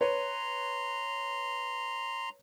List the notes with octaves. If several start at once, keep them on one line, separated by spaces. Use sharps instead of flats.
B4 C#5 A#5 C6